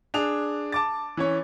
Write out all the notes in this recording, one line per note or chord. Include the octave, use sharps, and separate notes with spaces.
D4 G#4 F7
A5 D6 A6
E3 C#4 C#5